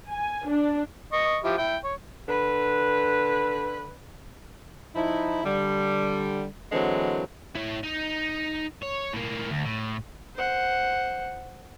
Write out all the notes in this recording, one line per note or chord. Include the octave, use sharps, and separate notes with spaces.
G#5
D4
D#5 C#6
F3 E4 G4
E4 G5
C#5
D3 B4
F3 D#4 E4
D3 G3
D3 E3 F#3 G#3 C4
E4 C#5
D#4
C#5
A2 A#3
D2
A2
C5 F#5